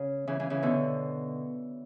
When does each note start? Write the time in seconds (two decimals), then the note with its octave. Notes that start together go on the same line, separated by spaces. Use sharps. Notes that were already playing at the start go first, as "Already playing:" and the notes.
Already playing: C#3
0.27 C#3 E3
0.40 C#3 E3
0.50 C#3 E3
0.63 B2 D3